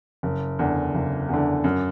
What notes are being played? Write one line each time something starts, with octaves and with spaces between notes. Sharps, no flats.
F#1
E2 D3
F#1
E2 D3
F#2